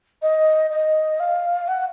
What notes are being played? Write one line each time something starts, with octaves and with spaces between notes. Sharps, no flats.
D#5
D#5
F5
F#5